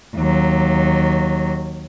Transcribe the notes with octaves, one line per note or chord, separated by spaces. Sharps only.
D#2 F#3